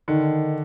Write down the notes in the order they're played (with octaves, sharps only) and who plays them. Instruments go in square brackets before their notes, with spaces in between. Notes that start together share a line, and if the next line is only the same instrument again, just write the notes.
[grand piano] D3 [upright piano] D#3